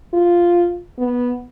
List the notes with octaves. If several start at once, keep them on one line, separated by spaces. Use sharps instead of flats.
F4
B3